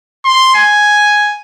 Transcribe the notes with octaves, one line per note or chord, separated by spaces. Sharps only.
C6
G#5